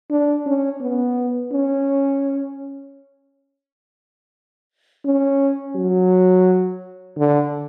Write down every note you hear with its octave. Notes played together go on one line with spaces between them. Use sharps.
D4
C#4
B3
C#4
C#4
F#3
D3